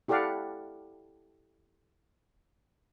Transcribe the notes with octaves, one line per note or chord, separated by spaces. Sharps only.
E4 G4 A4 D5 F5 F#5